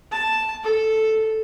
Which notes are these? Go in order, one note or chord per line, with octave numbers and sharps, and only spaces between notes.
A5
A4